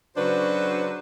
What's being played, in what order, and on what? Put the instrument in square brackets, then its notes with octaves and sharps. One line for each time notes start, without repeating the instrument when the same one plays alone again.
[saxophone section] C#3 F#3 D4 F#4 B4 C5